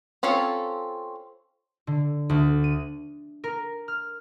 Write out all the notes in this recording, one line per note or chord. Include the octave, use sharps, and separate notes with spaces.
C4 C#4 F4 A4 C#5
D3
D2
D#7
A#4
F6